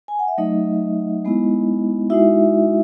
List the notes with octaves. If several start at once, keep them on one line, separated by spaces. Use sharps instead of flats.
G#5
F#5
E5
F#3 A3 D#4 D#5
G#3 B3 E4
G#3 D#4 E4 F#4 E5